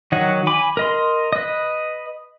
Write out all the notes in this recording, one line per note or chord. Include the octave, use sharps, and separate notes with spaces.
D#3 F#3 C#5 D#5 F#5
G#5 B5 D6
A#4 D#5 C6
B4 D#5